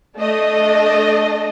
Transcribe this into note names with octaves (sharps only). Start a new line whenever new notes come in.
A3 D4 A4 D#5